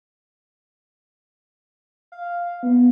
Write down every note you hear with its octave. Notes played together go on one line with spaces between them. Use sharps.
F5
B3